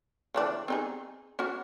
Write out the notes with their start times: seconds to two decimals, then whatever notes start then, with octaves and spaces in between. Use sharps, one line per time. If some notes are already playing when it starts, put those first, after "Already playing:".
0.35 C#3 E3 D4
0.68 C4 D#4 G#4
1.39 C#4 F#4